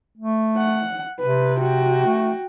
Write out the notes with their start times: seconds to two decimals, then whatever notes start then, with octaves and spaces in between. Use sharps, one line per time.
0.18 A3
0.58 F#5
1.20 C3 B4
1.59 F#4 G5
2.06 A3